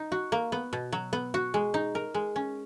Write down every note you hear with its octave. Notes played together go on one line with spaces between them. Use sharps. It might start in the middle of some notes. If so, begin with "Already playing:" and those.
Already playing: D#4
F#4
A#3
B3
B2
F#3
B3
F#4
G#3
D#4
A#4
G#3
C#4